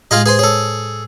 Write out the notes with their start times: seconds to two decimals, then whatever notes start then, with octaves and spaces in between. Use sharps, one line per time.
0.11 A2 G#3 F4 G#4 D#5
0.26 G#4 B4 C5 G#5 C6
0.39 G#4 A4 C#5